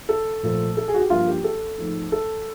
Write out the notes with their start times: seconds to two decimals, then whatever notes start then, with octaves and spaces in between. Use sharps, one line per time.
0.09 A4
0.43 A#2 F3 A3
0.77 A4
0.88 G#4
0.94 F#4
0.99 G4
1.10 G2 D3 F3 A#3 F4
1.28 G4
1.44 A4
1.78 G#2 F3 A3 C4
2.12 A4